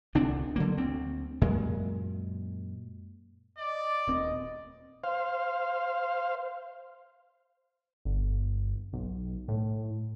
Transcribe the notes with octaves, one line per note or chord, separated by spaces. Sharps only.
C2 D3 C4 D4
D3 F#3 A#3
D2 C4
F#2 A#2 G#3
D5 D#5
D#1 C4 D#5
C5 F5
G1
B1
A2